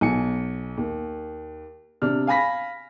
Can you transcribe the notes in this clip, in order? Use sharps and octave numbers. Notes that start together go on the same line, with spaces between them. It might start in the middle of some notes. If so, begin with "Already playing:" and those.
B1 G#5 C#7
D#2
C3 D4 F6
F5 G#5 B5 A#6 B6